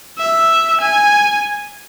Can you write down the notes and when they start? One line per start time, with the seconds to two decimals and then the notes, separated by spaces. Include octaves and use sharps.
0.18 E5
0.80 G#5